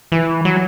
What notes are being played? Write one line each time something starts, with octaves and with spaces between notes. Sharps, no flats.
E3
F#3